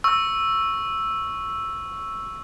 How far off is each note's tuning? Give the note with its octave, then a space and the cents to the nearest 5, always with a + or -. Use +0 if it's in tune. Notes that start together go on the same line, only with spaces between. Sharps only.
C#6 +0 E6 +0